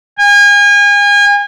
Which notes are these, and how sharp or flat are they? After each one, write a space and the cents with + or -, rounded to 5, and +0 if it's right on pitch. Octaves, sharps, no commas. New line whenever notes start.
G#5 -35